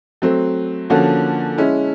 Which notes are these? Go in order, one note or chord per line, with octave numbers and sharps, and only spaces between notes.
F#3 A3 C4
D3 F3 A#3 C#4 F#4
G#3 C#4 E4